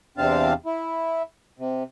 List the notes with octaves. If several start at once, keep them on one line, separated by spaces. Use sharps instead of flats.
E2 C3 C4 D4 F5 A5
E4
C3